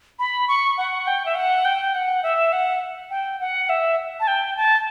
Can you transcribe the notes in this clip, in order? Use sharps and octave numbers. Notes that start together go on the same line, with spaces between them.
B5
C#6
F#5
G5
E5
F#5
G5
F#5
E5
F#5
G5
F#5
E5
A5
G5
A5